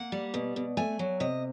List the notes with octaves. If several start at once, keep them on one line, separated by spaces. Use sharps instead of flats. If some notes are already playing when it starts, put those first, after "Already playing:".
Already playing: A#3 F#5
G3
B2
B2
A3 G#5
F#3
C3 D#5